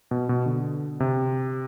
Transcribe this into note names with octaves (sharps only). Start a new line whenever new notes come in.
B2
B2
D3
C3